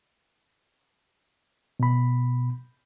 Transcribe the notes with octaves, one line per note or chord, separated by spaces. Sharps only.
B2 B5